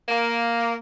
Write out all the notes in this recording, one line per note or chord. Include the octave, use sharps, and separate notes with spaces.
A#3